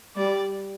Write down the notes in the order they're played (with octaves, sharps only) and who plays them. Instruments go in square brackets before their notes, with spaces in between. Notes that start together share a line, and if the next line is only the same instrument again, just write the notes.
[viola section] G3 [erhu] D5